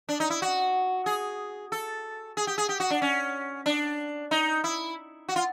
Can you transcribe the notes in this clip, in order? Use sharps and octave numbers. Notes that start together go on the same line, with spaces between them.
D4
D#4
E4
F#4
G#4
A4
G#4
G4
G#4
G4
F#4
D4
C#4
D4
D#4
E4
F#4
F4